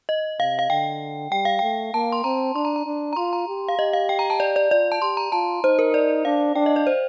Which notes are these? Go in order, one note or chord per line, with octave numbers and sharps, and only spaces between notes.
D#5
C3 F5
F5
D3 G5
G3 G5
F5
A3 G5
A#3 A5
C6
C4 A#5
D4 C6
A#5
A#5
D4
A#5
F4 C6
A#5
G4
F5
G4 D#5
F5
G5
A#5
A5
D5
D5
F4 D5
A5
G4 C6
A#5
F4 A5
D#4 C5
A#4
D5
D4 F5
D4 G5
D#5
D5
C5